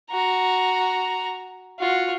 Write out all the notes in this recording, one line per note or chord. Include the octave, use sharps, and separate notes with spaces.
F#4 A#5
F4 F#4